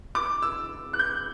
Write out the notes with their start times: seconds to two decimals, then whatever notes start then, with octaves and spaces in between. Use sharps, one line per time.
0.15 D6
0.42 E6
0.93 F#6
0.99 G6